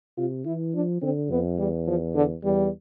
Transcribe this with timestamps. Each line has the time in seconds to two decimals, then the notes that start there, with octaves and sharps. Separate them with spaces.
0.18 C3 F4
0.46 E3 E4
0.75 F3 D4
1.02 D3 C4
1.31 F2 B3
1.59 E2 G3
1.87 F3
2.15 D3
2.43 E2 G3